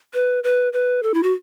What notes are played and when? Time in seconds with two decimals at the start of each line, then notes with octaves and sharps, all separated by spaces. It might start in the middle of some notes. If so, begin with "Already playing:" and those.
0.14 B4
0.44 B4
0.73 B4
1.03 A4
1.14 E4
1.23 F#4